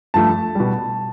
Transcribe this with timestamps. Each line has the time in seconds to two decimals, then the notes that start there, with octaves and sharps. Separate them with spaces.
0.14 G2 F3 A3 A5
0.55 B2 G3